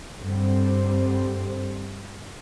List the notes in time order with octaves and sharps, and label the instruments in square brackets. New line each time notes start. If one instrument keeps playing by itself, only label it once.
[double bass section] G2 D3 G3 C4